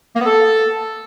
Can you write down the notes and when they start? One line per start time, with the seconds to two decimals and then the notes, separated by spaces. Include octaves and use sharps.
0.15 A#3
0.20 B3
0.25 A4